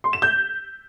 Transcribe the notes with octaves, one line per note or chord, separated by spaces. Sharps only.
C6
E7
G6